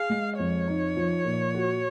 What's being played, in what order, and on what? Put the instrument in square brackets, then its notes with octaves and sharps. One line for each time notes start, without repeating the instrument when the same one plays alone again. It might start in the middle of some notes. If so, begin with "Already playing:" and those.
Already playing: [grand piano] G#4 [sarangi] F5
[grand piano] G#3
[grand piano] F2 [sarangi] C#5
[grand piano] D#4
F3
A#2
F#4